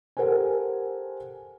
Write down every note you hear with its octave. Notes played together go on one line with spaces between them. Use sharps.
G4 A4 A#4 C5 F#5 G#5